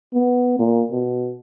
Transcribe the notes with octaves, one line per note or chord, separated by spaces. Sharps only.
B3
A#2
B2